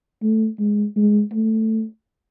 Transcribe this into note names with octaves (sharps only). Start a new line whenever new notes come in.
A3
G#3
G#3
A3